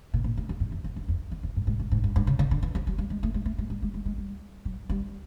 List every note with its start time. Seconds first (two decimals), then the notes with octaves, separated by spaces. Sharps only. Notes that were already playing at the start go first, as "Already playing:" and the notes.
0.14 A#2
0.24 A#2
0.37 A2
0.49 F2
0.60 F#2
0.72 E2
0.84 F2
0.96 E2
1.08 F2
1.32 E2
1.43 F2
1.56 G2
1.67 G#2
1.80 G#2
1.92 G#2
2.04 G2
2.16 G2
2.27 C#3
2.39 D3
2.51 D3
2.63 E3
2.75 F3
2.87 F#3
2.98 G3
3.10 G#3
3.23 A3
3.34 G#3
3.46 A3
3.58 G#3
3.70 G3
3.82 G#3
3.94 G#3
4.06 G#3
4.18 G3
4.65 F#3
4.90 G3